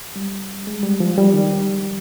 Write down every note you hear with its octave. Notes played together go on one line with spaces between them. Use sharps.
G3
G#3
G3
F3
G3
D#3